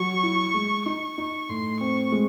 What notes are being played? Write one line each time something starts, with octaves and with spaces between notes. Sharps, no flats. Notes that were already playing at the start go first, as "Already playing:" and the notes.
Already playing: F#3 C#6
E4
G#3
D#4 C#6
D#4
A2 C6
C4 C#6
G#3